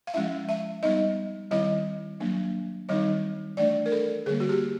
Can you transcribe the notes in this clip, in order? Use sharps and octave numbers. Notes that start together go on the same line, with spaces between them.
F5
F3 G#3 C#4 E4 E5
E5
G3 B3 D#4 D#5
D#3 G3 C4 E4 D#5
F#3 A#3 D4
D#3 G3 C4 D#4 D#5
E3 A3 D4 D5
A#4
A4
D3 G3 A#3 G#4
F#4
G4